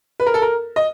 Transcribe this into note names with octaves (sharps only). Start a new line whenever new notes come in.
B4
A#4
A4
A#4
D#5